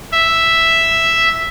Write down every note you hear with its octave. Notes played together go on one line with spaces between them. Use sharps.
E5